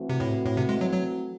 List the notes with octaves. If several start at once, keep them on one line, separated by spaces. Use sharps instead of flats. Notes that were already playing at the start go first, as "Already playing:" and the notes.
Already playing: E3 A3 C4 F#4
C3
A2
A2
C3
G#3
F#3
F#3